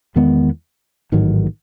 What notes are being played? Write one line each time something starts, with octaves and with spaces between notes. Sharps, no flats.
E2 D#3 G#3 B3
A1 G#2 D#3 F#3